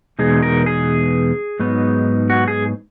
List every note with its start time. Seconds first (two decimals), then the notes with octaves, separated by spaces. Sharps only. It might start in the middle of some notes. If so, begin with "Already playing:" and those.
0.19 E2 B2 G#3 D#4 G#4
0.42 A#4
0.66 G#4
1.59 G#2 F#3 B3 D#4
2.30 F#4
2.48 G#4